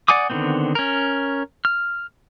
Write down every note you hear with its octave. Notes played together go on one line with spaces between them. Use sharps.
D5 F#5 G#5 D6 D#6
D3 D#3 F3 B3 C4
C#4 A#4
F6